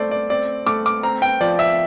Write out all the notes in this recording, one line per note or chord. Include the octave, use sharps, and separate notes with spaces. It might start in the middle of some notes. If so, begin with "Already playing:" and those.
Already playing: A3 C4 C5 D5
D5
C4 D5
A3 D6
D6
C4 A#5
G5
F3 D5
E5